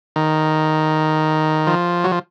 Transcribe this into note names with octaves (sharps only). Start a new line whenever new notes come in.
D#3
F3
F#3
F3